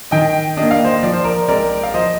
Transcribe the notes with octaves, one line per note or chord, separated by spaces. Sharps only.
D#3 D#5 G5
A#3 D4 D#5
F5
C5 D#5
F3 D5
C5
A#4 D5
G#3 C4 A#4 D5
F5
F3 C5 D#5